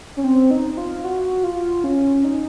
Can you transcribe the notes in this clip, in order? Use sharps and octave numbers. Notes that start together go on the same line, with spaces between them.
C#4
C4
D#4
F4
F#4
F4
C#4
D#4